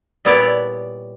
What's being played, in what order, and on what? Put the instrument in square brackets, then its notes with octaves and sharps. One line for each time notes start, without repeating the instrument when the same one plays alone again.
[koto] A#2 G3 B3 E4 C#5 D5